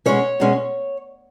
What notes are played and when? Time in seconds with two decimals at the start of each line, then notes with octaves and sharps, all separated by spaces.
0.06 B2 G#3 C#4 C#5
0.40 B2 G#3 C#4